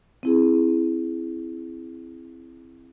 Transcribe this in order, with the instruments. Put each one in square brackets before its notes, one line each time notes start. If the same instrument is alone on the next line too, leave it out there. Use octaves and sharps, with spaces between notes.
[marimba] C4 E4 G#4